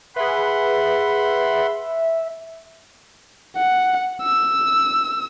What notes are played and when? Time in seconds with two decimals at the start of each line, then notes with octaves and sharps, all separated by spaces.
0.16 G#4 B4 E5 F#5 B5 C6
3.57 F#5
4.23 E6